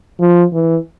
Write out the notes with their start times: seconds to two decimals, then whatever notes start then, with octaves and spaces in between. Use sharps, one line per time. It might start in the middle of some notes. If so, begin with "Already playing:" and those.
0.20 F3
0.53 E3